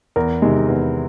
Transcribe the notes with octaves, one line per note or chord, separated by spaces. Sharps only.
E2 A#4
C3 D#3 G#3
E2 B4